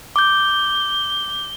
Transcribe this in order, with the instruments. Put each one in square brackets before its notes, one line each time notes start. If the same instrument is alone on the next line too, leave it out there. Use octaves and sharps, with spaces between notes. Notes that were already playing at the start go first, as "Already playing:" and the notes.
[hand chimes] D6 G6 [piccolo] G7